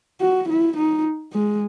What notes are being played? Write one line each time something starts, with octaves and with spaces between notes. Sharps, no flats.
F#4
E4
D#4
G#3